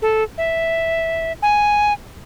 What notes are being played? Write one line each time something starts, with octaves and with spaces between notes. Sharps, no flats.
A4
E5
G#5